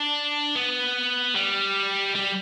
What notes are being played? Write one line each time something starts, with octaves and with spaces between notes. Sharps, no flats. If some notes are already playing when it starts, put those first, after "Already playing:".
Already playing: D4
B3
G3
G3